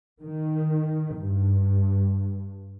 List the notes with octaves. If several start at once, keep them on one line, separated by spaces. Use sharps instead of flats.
D#3
G2